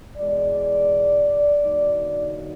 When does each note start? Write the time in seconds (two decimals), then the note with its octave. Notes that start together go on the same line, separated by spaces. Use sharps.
0.17 E2 B2 G#3 D5
1.64 D3 F#3 A#3 D#4